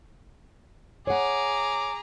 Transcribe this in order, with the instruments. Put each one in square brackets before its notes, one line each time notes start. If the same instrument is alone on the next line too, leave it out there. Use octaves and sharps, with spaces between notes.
[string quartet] G#4 A#5 [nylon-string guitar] C#5 F#5 [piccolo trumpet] D6